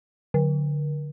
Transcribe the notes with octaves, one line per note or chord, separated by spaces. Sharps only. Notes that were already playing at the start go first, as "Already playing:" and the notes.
D3